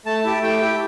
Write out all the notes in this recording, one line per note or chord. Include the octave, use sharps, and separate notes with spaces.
A3 A5
E4 G4
A3 G5
E4 G4